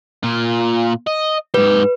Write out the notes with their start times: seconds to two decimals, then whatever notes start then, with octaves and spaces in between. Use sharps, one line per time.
0.23 A#2 F4
1.07 D#5
1.54 G#2 G4 B4